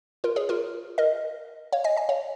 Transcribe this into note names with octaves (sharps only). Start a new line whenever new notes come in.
F4 A#4
G#4 C#5
F4 A#4
A#4 D#5
C#5 F5
D#5 G#5
D#5 G#5
C#5 F5